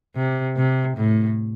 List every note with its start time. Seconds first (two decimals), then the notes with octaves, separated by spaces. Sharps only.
0.15 C3
0.56 C3
0.97 A2